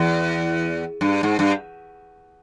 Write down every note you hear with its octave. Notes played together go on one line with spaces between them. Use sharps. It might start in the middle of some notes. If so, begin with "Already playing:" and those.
Already playing: E2
G2
G#2
G2